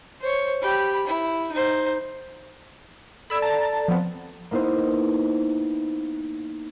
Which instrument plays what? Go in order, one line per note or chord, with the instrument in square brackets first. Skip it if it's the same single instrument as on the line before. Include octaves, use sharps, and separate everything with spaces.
[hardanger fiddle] C5 C#5
G4 B5
E4
D#4 C5
[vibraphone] A4 D5 [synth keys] B5 E6 G#6
[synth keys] A5 A#5 A6
F3 B3 C4
[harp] A#3 B3 D#4 E4 C5